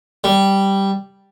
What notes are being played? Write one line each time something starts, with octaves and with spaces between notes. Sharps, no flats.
G3